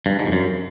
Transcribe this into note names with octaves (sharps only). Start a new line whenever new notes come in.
G2
G#2
F2
F#2